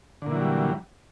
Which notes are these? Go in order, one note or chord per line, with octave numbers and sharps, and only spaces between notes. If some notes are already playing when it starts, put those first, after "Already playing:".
A#2 D3 E3 F#3 G3